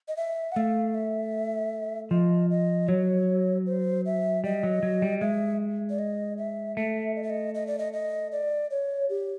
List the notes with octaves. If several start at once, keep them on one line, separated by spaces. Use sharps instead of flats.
D#5
E5
F#5
A3 F5
E5
F3 D#5
D#5
F#3 C#5
C5
E5
G3 D#5
F#3
F#3
G3
G#3 E5
D5
D#5
E5
A3 E5
D#5
E5
D#5
D#5
D5
D#5
D#5
D5
C#5
G4